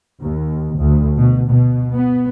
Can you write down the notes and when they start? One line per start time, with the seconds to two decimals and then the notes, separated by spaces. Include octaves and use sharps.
0.21 D#2
0.78 D2
1.17 B2
1.48 B2
1.92 B3